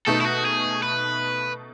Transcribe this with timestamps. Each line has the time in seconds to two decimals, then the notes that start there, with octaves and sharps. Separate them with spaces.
0.06 B2 A3 D#4 A4
0.21 E4
0.26 F#4
0.45 G#4
0.83 B4